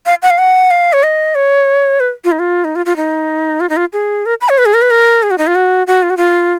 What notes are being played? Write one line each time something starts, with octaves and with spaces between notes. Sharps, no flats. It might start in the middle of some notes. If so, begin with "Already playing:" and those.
F5
F#5
F5
F#5
F5
C#5
D#5
C#5
B4
F4
D#4
F4
D#4
F4
F4
D#4
F4
D#4
F4
G#4
A#4
B5
C#5
B4
G#4
A#4
B4
A#4
G#4
F#4
D#4
F4
F#4
F#4
F4
F#4
F4